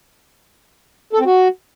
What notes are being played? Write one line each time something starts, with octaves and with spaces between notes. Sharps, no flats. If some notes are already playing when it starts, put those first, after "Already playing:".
A4
C4
F#4